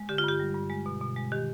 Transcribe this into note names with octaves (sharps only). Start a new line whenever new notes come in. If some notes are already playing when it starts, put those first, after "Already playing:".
Already playing: G#3
D3 G4
F4
G2 G4
G3
G2
G#3
B2
B2
G#3
D#3 G4